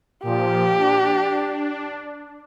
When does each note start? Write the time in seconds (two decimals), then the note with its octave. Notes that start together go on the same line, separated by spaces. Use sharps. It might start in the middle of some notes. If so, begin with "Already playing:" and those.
0.23 A#2 F3 G4
0.78 D4